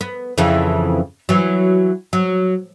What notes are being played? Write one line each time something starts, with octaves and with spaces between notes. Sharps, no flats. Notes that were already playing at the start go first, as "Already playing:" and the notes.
B3
F2 C#3 E3
E3 F#3
F#3